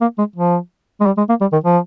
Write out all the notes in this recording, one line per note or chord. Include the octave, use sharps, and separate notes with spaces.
A#3
G#3
F3
G#3
G3
G#3
A#3
G3
D#3
F3